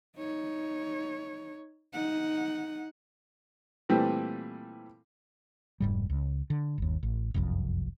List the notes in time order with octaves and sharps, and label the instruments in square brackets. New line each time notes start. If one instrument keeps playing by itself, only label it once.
[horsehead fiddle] D#4 C#5
D#4 F#5
[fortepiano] A#2 E3 G3 A3 C4
[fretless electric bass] F1 G#2 G3
C#2
D3
G1 D#2
A1
F#1 C2 F2